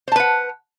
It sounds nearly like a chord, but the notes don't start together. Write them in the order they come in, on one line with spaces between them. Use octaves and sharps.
C5 A5 B4 F#5